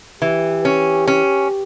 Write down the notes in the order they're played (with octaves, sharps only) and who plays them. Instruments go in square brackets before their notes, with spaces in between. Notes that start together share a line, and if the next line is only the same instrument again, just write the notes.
[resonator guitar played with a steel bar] E3 [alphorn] G4
[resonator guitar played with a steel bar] C#4
C#4